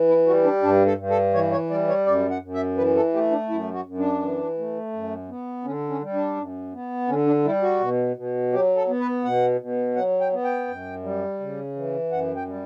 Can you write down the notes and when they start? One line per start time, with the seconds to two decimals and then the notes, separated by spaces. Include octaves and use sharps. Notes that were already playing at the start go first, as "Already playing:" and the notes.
Already playing: E3
0.08 E4
0.27 G3 F#4
0.44 D4
0.63 G2 D4
0.86 A4
0.98 G2
1.10 A4
1.34 E3 C#5
1.52 C#5
1.70 G3 D5
1.88 C#5
2.06 F#2 D5
2.30 F#5
2.42 F#2
2.54 E5
2.77 E3 B4
2.96 A4
3.14 A3 G4
3.31 D4
3.49 F#2 E4
3.74 F#4
3.85 F#2
3.97 D4
4.22 E3
4.58 A3
4.93 F#2
5.29 B3
5.65 D3 C#4
5.90 C#4
6.02 G3
6.14 D4
6.36 F#2
6.73 B3
7.09 D3 C#4
7.26 D4
7.45 G3 E4
7.62 F#4
7.80 B2
8.16 B2
8.53 F#3 G4
8.76 A4
8.88 B3
9.00 B4
9.24 B2 F#5
9.61 B2
9.96 F#3 F#5
10.21 G5
10.33 B3
10.44 G5
10.67 F#2
11.04 G3
11.40 C#3
11.76 E3
12.12 F#2 F#5
12.36 G5
12.48 G3